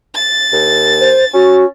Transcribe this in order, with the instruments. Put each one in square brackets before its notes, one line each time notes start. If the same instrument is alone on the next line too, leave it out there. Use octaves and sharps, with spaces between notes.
[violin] A6
[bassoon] D#2
[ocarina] C5
[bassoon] C#4 [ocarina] F#4